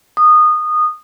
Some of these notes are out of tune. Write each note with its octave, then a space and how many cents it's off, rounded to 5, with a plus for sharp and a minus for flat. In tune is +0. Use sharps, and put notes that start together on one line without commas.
D#6 -20